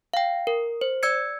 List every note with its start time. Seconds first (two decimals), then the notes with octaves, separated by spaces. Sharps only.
0.14 F5 G5
0.47 A#4
0.81 C5
1.03 D5 E6 G#6 C#7